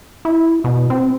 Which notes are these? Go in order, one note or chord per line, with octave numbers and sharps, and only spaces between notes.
E4
B2
C4